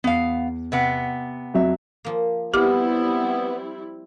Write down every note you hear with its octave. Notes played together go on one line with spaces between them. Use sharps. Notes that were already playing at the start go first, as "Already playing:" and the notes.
E2 B3 F5
C3 B3 F#5
F2 F#3 E5
F3 A#3
G3 B3 C4 E4 G4 D6 F6